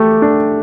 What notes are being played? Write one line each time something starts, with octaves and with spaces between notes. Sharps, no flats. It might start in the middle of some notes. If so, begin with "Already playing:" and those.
Already playing: A3 G4
D4